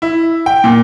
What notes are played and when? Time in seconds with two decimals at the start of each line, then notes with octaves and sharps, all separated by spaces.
0.02 E4
0.46 G5
0.64 A#2